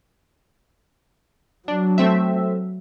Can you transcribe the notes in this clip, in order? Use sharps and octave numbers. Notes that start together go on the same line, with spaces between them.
F#3 D4
A3 C4 E5